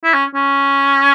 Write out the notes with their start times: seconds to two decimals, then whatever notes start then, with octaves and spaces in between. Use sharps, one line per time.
0.04 E4
0.14 C#4
0.35 C#4